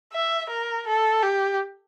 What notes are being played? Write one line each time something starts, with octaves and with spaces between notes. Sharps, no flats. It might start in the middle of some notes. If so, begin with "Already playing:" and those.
E5
A#4
A4
G4